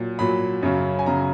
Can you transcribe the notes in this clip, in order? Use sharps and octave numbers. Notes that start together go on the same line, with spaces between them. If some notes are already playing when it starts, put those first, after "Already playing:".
Already playing: A#2 F#3
A#2 F#3 B5
F#2 C#3 F#3
G#5
F#2 C#3 F#3 A#5